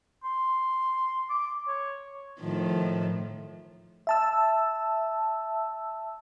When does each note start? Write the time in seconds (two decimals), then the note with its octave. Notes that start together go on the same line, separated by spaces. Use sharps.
0.24 C6
1.30 D6
1.68 C#5
2.39 A2 D#3 F3
4.07 E5 A5 E6